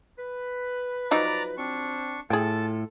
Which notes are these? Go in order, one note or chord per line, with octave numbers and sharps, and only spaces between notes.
B4
F3 F#3 D#4 D5 A#5 D6
C4 D4 C#6
A2 A3 F4 G#4 A4 G5 A5